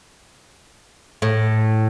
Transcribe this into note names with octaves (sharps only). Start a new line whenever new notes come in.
A2